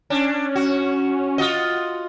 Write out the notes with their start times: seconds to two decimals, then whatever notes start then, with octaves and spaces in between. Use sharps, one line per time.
0.10 C#4 D4
0.55 F#4
1.38 F4 F#4 D#5